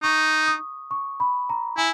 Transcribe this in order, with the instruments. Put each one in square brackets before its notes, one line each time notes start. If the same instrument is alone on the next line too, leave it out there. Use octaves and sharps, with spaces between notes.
[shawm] D#4 [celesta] C#6
[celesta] D#6
C#6
B5
A#5
[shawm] E4 [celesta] G#5